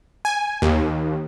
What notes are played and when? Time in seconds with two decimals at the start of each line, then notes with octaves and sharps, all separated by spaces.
0.25 G#5
0.62 D#2